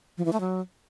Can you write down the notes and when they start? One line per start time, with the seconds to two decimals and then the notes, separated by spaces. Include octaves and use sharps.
0.18 F3
0.25 E3
0.33 A3
0.40 F#3